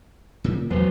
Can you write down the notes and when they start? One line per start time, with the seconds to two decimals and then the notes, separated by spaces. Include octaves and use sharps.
0.44 A#2 C#3 A#3
0.70 E2 F#3 B4 C5